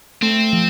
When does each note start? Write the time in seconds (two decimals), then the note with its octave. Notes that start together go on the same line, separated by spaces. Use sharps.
0.22 A3 C4
0.53 F3